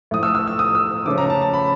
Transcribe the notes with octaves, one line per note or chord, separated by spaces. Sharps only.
A2 F3 A3 D#6
E6
E6
E6
D#6
E6
C#3 F3 A3 C#4 D6
A#5
A5
A5
B5